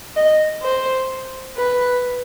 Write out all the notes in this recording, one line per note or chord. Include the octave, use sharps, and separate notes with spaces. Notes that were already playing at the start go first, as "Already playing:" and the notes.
D#5
C5
B4